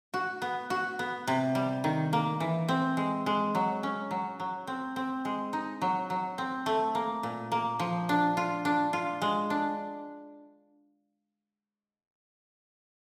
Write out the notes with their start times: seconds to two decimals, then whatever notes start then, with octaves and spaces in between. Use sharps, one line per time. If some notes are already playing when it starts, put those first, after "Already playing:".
0.14 F#4
0.42 B3
0.70 F#4
0.99 B3
1.27 C3
1.55 G3
1.84 D#3
2.13 A#3
2.40 E3
2.69 C4
2.97 G#3
3.26 G#3
3.55 F#3
3.83 C#4
4.11 F#3
4.40 F#3
4.67 C4
4.96 C4
5.25 G#3
5.53 D#4
5.82 F#3
6.10 F#3
6.38 C4
6.66 A3
6.95 A#3
7.23 A#2
7.52 A#3
7.79 F3
8.09 D4
8.37 F4
8.65 D4
8.93 F4
9.22 G#3
9.50 D4